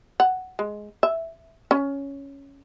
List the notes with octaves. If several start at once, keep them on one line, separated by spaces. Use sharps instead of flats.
F#5
G#3
E5
C#4